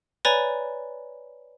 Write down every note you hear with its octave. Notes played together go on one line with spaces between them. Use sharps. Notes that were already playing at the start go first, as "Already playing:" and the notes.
B4 C#5 D5 G#5 A#5 B5